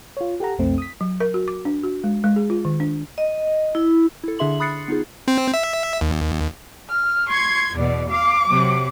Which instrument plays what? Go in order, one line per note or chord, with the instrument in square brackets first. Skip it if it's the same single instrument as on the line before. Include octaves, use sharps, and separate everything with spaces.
[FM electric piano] F4 C#5
G4 A4 F#5 A#5
B1 F2 A3 C4
D#6 B6
[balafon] F#3
A#4
F#4
D6
D4
F#4
G#3
G#3
G#4
F4
D#3
D4
[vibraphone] D#5
E4
[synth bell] E4 A4
D3 D4 G#4 E5 C6 F#7
B5 D#6 F#6 A6 C7 C#7
B3 D#4 F4 G#4
[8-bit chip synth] C4
E5
D#2
[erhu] F6
[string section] C6 G#6 [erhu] C#6
[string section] E2 B2 [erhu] D5
[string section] F5 [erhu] D6
[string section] C3 F#3